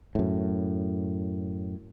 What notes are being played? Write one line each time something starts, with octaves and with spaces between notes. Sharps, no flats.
F#2 A2